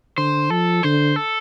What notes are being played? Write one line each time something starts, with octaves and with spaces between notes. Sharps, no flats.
D3 C5
F3 A4
D3 C5
A4